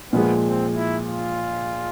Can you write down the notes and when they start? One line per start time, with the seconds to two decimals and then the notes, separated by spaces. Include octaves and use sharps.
0.12 A#2 F3 G#3 B3
0.45 C4
0.75 E4
1.07 F4